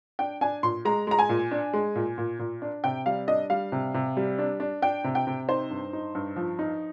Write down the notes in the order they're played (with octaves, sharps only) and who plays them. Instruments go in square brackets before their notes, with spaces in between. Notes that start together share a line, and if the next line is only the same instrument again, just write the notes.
[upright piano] D4 G5
D4 G#5
A#2 C6
G#3 A#5
G#3 A#5
G#5
A#2
D4
G#3
A#2
A#2
A#2
D4
C3 G5
G3 F5
D4 D#5
G3 F5
C3
C3
G3
D4
D4
D4 G5
C3
G5
C3
D#4 C5
G2
D#4
G2
F3
D#4